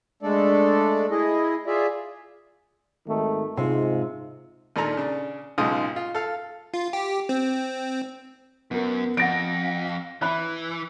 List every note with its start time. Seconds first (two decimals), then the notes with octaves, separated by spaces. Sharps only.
0.23 G#3 A3 D4 A4 D5
1.11 E4 G#4 D#5
1.66 F4 G#4 D5 E5
3.07 G#1 D#3 A3
3.57 G#2 C3 G#3 F4
4.76 D#2 A#2 D4 A4 A#5
4.97 C#3 D4
5.58 B1 G#2 C#3 G#3 F4 D#6
5.96 F4
6.15 A4 F5
6.74 F4
6.93 G4
7.29 C4
8.71 F#2 B3 A#4
9.17 F2 F#5 A#6 D7
10.22 E3 E5 B5 F#6